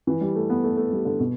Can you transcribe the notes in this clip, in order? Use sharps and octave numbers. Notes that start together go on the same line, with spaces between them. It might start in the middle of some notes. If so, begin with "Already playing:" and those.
E3
G3
A3
B3
A3
A3
G3
D3
B2